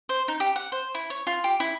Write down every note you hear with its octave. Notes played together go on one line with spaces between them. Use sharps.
C5
D#4
G4
F#5
C5
E4
C#5
F4
G4
E4